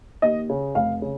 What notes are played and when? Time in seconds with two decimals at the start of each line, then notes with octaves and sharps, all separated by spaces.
0.22 D#2 D#5
0.49 C#3
0.75 F1 F5
1.02 C#3